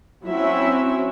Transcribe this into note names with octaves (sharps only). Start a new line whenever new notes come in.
F#3 C4 C#4 E4 E5